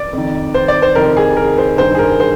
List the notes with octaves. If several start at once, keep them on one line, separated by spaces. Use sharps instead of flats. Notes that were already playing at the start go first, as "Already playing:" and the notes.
Already playing: D5
F2 D#3
C5
D5
C5
F2 C3 D#3 A#4
G#4
A#4
C5
G2 D#3 C5
G#4
A#4
C5